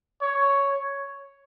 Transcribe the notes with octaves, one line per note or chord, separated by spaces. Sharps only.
C#5